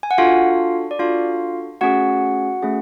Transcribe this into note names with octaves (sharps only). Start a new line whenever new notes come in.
G#5
F#5
D4 F4 F#4 A4 F5
D5
D4 F4 F#4 A4 F5
A3 C#4 F#4 G#4 F#5
A3 C#4 G#4